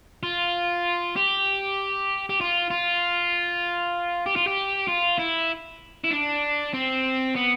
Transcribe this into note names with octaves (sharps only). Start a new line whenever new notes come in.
F4
G4
G4
F4
F4
G4
F4
G4
F4
E4
E4
D4
C4
B3